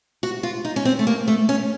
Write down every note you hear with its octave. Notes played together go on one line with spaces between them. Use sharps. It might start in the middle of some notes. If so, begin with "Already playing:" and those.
F#4
F4
D#4
C#4
C4
A3
A#3
A3
C#4